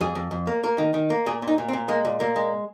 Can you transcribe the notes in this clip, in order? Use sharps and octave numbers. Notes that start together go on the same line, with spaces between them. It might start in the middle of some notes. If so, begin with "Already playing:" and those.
F2 G#4
F2
F2
A#3
A#3 A#4
D#3
D#3
A#3
A#2 G#4
A#2
D#4
A#2
C4
A#2
G#3 A#3
A#2
A#2 A#3
G#3